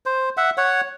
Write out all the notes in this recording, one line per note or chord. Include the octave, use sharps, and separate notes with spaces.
C5
E5 F#5
C#5 F#5